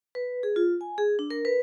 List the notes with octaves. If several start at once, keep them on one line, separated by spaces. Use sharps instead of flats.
B4
G#4
F4
G#5
G#4
D4
A#4
B4